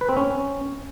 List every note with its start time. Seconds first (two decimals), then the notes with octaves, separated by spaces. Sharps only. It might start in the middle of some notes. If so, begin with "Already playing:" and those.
0.01 B4
0.09 C4
0.17 C#4